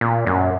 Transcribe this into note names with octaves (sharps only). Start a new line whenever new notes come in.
A#2
F#2